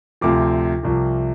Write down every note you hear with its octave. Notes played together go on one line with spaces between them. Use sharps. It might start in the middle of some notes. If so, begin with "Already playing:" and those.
D2 C3 F3 D6
C2 C3 F3